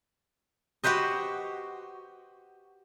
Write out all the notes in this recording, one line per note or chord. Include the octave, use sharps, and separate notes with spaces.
F#4 G4 B4 C5 D#5